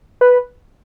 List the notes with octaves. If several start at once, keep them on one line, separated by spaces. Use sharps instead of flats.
B4